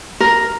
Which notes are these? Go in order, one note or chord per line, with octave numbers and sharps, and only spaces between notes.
A#4